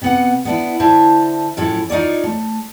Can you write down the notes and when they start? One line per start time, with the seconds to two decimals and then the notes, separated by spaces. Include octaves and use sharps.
0.02 C3 B3 F#5
0.45 B3 D4 E4
0.80 D3 E4 C5 E5 A5
1.57 F#2 A2 F3 E4 A4 C#5
1.89 D#4 F4 C#5 D5
2.24 A3